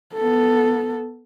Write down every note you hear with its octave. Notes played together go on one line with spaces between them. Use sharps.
B3 A4